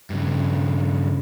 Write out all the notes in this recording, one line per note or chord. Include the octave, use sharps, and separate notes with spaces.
G2 C#3